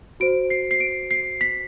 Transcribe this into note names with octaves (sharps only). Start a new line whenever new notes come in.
F#4 C5 D7
C7
C7
D7
C7
B6